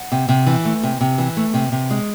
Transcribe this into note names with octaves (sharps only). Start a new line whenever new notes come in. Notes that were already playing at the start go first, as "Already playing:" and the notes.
Already playing: F#5
C3
C3
E3
A3
C3
C3
E3
A3
C3
C3
G#3